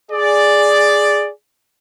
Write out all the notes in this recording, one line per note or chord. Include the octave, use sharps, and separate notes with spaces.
G#4 D5